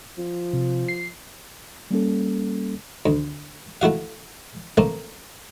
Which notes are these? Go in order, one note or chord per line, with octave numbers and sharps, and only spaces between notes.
F3
C3
C7
G3 A#3 C#4 A4
D2
A3 E4 F#4 F5
A3 A#3 C4